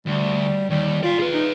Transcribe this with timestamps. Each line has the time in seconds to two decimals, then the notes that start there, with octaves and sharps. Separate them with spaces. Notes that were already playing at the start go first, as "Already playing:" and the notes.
0.07 D2 G3
0.70 D#2 G3
1.03 F4 D5 F5
1.19 G#4 B4
1.34 D#4